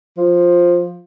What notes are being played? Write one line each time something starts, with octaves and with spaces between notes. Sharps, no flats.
F3